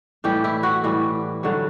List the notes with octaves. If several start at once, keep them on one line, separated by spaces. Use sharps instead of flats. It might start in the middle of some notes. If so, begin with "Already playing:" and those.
A2 E3 G3 G4
E4
F#4
A2 E3 G3
G2 D3 F#3